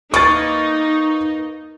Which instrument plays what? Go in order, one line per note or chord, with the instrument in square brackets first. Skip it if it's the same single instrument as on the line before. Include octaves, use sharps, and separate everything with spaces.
[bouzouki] A#3 B4 [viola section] D#4 [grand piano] C#6 A6